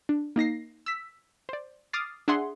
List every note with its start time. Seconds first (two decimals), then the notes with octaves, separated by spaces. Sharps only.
0.09 D4
0.36 A#3 D#4 A#6 C7
0.86 E6 B6
1.49 C5 D5
1.93 D6 D#6 F6 A6 C7
2.28 D4 G#4 E5 F#5 C6